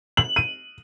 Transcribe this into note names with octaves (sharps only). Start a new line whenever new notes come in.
F#7
D#7